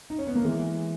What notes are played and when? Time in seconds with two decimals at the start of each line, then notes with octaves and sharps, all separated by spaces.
0.10 D#4
0.18 C#4
0.27 B3
0.35 A#3
0.44 E3 G#3